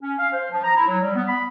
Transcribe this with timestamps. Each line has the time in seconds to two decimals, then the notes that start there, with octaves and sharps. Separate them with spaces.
0.03 C#4
0.19 F5
0.32 C5
0.51 F3
0.64 A#5
0.76 E4
0.88 F#3
1.02 G3
1.16 B3
1.27 B5